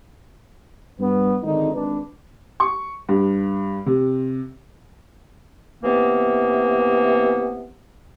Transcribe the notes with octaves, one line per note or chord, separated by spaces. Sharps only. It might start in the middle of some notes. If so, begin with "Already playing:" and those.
G2 B3
G#1 D3 D#4
G#1 D4 B4
C#6
G2
C3
C3 E3 A#3 B3